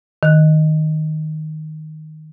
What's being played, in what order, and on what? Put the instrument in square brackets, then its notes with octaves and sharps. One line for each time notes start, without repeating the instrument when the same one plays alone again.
[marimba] D#3 F#6